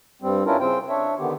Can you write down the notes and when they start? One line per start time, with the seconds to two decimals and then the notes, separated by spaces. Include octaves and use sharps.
0.22 G2 G3 C4
0.46 C#4 D4 E4 F4 A#4
0.60 C#3 C4 C5 G5
0.89 D4 C#5 E5
1.19 D3 D#3 B3 G4